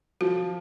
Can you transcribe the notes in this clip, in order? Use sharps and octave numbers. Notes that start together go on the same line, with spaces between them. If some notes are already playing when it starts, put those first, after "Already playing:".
F3 F#4